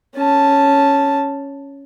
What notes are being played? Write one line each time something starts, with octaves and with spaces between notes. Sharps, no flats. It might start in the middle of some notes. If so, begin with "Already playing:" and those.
C#4 A5